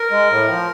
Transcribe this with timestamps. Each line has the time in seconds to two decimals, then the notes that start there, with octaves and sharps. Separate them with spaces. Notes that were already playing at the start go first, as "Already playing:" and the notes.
Already playing: A#4
0.11 G#3
0.30 A2
0.48 F3